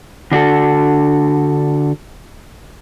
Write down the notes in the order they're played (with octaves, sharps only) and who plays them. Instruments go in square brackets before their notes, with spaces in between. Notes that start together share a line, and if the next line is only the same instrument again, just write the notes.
[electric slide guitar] D3 D4 F#4 A4